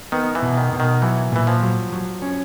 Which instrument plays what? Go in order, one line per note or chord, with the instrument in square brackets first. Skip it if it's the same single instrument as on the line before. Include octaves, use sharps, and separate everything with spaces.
[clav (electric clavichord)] D#3 [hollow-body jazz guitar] B3
[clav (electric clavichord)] E3
[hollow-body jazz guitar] B2
[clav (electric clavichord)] D#3
[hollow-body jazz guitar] B2
[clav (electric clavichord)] D#3
[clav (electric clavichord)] E3 [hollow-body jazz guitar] F#3
[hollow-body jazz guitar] A#2 [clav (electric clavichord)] E3
[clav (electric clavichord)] F3
[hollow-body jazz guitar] F#3
F#3
C#4